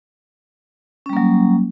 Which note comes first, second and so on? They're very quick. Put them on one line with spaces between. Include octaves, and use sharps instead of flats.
C#4 G3 A#3 F#3